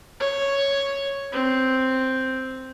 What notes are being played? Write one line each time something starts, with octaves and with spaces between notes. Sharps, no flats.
C#5
C4